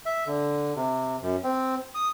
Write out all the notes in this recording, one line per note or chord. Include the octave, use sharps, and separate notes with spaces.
E5
D3
C3
F#2
C4
D#6